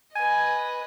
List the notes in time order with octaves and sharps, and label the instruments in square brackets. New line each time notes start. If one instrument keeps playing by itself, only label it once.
[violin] B4 D#5 [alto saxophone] G#5